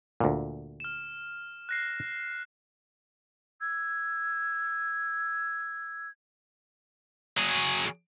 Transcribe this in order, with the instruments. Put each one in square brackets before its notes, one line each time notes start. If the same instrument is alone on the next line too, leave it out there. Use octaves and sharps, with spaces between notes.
[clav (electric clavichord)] D2 A#2
[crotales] F6 E7
F#6 A#6 C7
[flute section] E6 G#6
[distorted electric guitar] F#3 G#4